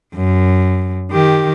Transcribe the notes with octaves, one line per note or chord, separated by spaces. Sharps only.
F#2
D#3 G4